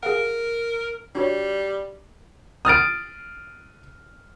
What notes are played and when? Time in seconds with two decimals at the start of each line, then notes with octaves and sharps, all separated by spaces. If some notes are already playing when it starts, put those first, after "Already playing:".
0.03 G#4 A#4 F5 F#5
1.15 G3 D4 F#4 C#5
2.65 D#6 F6 A6 D7